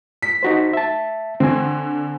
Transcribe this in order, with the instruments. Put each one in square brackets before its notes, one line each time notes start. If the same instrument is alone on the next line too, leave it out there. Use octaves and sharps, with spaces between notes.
[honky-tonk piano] B6
[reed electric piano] D#4 F#4 C5
E5 A5
[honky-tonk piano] D3 [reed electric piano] C4 G#5